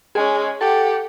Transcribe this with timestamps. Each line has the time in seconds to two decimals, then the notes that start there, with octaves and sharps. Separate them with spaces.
0.15 G#3 C#4 G#4
0.61 G4 A4 F#5